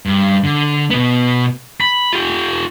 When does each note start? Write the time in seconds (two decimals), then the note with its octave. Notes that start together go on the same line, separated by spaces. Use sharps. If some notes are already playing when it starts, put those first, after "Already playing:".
0.06 G2
0.44 D3
0.90 B2 B3
1.81 B5
2.13 F4 G4